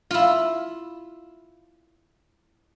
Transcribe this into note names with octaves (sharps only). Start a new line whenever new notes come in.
E4 F4